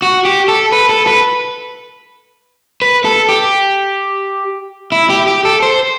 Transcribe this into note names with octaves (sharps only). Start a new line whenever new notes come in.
F#4
G4
A4
B4
A4
B4
B4
A4
G4
E4
G4
G4
A4
C5